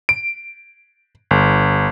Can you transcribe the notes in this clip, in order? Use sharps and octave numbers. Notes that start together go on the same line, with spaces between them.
D7
G1